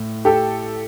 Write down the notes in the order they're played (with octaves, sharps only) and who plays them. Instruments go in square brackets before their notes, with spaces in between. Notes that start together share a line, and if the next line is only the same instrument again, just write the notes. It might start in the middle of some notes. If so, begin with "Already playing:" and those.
Already playing: [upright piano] A2
[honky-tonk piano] G4 A4